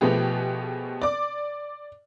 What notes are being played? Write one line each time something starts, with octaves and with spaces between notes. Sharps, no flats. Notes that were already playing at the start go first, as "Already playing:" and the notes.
B2 F3 A3 B3 G4 G#4
D5 D6